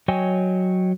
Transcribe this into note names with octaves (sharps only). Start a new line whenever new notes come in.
F#3 C#5 D#5 G5 G#5